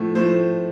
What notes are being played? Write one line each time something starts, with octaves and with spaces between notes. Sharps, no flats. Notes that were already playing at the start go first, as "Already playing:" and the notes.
Already playing: A2 F3 A3
A2 F3 A3 C5